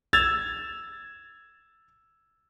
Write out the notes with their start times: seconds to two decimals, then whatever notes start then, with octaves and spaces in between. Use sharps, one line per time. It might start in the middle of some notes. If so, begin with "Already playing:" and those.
0.13 E6 G#6 A6 F7